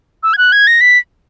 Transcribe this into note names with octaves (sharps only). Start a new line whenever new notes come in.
E6
G#6
F#6
G#6
A#6
B6